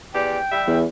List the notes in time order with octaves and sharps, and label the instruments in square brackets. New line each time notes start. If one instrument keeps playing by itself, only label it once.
[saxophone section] E2 G4 D5 [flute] G5
[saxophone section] G3 E5
[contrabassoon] E2